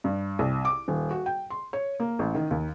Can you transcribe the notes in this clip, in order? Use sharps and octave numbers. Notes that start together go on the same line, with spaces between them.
G2
C2
D6
D#1
F#4
G5
C6
C#5
A#3
A1
D#3
D#2